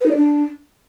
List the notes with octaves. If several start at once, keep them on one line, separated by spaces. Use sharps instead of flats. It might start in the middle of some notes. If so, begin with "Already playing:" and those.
B4
D#4
D5
D4